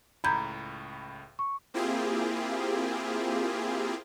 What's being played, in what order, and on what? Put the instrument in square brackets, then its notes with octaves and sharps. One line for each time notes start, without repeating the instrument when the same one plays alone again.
[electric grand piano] C#2 A2 [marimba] A#5 G6 G#6 [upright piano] B5
[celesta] C#6
[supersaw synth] A#3 C4 E4 F4 G4 G#4